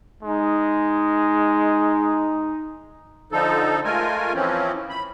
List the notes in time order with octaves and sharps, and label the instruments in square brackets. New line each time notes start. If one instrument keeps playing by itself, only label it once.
[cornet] G#3 [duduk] D#4
[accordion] D3 F3 D#4 A4
G#3 A3 F4 A#4 G#5
E3 F3 C4 C#4
B5